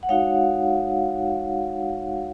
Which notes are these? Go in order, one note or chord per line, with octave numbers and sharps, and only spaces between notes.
F#5
G#3 D#4 F#4 C#5 F5